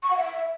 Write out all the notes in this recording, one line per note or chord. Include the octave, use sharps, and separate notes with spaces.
C#6
F#5
E5